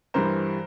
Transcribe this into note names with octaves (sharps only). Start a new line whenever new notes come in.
G2 E3 G3 A#4 C5